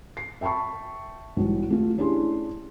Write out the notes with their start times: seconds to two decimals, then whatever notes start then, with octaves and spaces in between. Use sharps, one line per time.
0.17 C7
0.41 E5 G5 A5 B5 C#6
1.36 B1 G#2 E3 G3
1.70 A3 F4
1.98 C#4 D4 E4 G4 G#4 C6